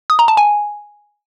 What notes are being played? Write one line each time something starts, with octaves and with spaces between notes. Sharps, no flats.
D#6
A#5
A5
G#5